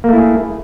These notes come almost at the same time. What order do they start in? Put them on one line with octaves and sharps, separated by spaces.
A#3 A3 E4 G#4